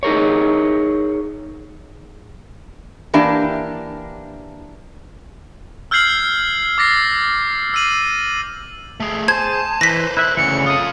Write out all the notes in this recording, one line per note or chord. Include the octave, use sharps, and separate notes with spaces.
D#4 G#4 A#4 C#5
E3 A#3 D4 G4
E6 F6 G6 G#6 C7 F#7
D6 A6 A#6 C7
E6 C7 D#7 F#7
A3 G#4
G#4 C5 A5 G#6
E3 B4 C5 A#6 B6
E4 E5 F#6
D2 C#3 E3 C#7
F4 A4 D#6